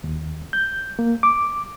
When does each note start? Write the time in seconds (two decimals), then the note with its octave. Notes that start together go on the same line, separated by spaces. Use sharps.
0.04 D#2
0.53 G6
0.99 A#3
1.23 D6